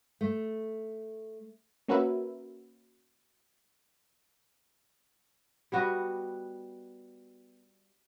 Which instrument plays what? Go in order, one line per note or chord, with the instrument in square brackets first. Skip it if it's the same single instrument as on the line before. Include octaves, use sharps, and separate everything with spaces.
[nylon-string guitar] A3
[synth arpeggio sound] A#3 C#4 F#4 A#4 B4 E5
[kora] G3 B3 F#4 D#5